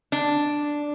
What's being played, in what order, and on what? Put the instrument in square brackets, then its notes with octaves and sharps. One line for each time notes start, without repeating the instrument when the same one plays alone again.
[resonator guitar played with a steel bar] D4